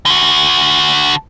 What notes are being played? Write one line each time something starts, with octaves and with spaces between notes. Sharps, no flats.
D3 F#4